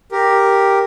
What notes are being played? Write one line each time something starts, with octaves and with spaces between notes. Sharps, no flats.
G4 A#4